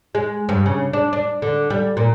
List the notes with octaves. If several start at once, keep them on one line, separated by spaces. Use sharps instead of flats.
G#3
G2
C#3
D4
D4
D3
G3
A#2